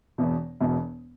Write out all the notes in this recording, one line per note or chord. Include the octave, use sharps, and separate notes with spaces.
E1 E2 B2
E1 E2 B2